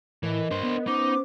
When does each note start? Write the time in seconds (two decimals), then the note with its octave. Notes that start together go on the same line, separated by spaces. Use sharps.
0.23 A2 E3 A#4 D#5
0.51 G2 D4 C5
0.63 B3
0.87 C#4 D#4 C5 D6